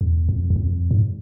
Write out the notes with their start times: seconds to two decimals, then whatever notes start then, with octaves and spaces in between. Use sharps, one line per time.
0.01 E2
0.29 F2
0.50 E2
0.56 F2
0.91 G#2